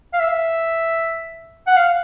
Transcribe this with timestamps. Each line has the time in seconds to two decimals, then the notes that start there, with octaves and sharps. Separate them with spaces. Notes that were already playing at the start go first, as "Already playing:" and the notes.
0.14 F5
0.20 E5
1.67 F#5
1.77 F5